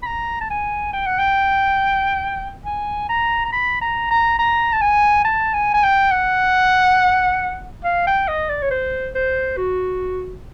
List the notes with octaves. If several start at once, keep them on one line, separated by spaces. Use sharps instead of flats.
B5
A#5
A5
G#5
G5
F#5
G5
G#5
A#5
A#5
B5
A#5
A#5
A#5
A5
G#5
A5
G#5
G#5
G5
F#5
F5
G5
D#5
D5
C#5
C5
C5
F#4